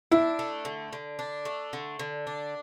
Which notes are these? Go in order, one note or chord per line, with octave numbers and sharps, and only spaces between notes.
D4 E4
A3
D3
D3
D4
A3
D3
D3
D4